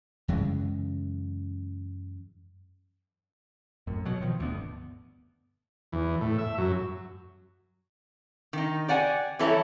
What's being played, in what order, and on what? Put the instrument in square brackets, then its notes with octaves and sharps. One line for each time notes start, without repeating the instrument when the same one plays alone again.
[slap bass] F#2 C#3 E3 G#3
[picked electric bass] F#2 A2
B2 F#3
B2 D#3 F3
D#1 D2 G2 B3
[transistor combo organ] E2
A2
E5
F#2
[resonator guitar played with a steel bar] D#3 D#4
G4 D5 F#5 G#5
E3 G3 E4 A4 C#5 A#5